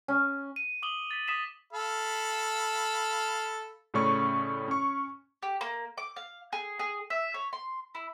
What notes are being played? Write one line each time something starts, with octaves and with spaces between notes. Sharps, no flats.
C#4
D#7
D6 D#6 F#7 G7
A6 B6
D#6 B6 E7
A4 F5 B5
A2 C#3 A3 C#4 D5 C#6
C#4 C#6
G4
A#3
D6
F5
G#4
G#4
E5
C#5
C6
E4